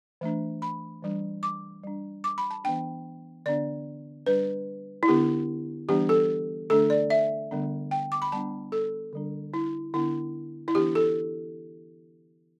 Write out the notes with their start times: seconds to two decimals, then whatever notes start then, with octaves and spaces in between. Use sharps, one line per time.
0.21 E3 A3 D4
0.62 B5
1.03 E3 G3 D4
1.43 D6
1.83 G3 D4
2.24 D6
2.38 B5
2.51 A5
2.64 E3 B3 D4 G5
3.46 D3 B3 D4 D5
4.26 G3 D4 B4
5.03 E4
5.08 D3 B3 D4 G4
5.89 E3 G3 B3 D4 G4
6.09 A4
6.70 D3 A3 D4 A4
6.90 D5
7.10 E5
7.51 D3 G3 B3 D4
7.91 G5
8.12 D6
8.22 B5
8.32 G3 B3 D4 A5
8.72 A4
9.13 D3 G3 D4
9.54 E4
9.94 D3 B3 D4 E4
10.68 E4
10.75 E3 B3 D4 G4
10.95 A4